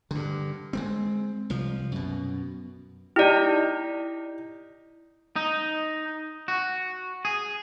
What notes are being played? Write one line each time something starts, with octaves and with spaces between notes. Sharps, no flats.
G2 D3
G#3 A3 C4
C2 F3
F#2 B2
D#4 E4 G4 D5
D#4
F#4
G#4